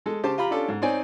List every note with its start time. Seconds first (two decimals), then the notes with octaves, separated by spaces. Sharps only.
0.06 G#3 A4
0.23 C#3 G4 C5 A5
0.38 F4 G4 A#5 B5
0.51 C#4 D4 F4 G4 A4
0.68 G#2
0.82 C4 D#4 C#5 D5 G#5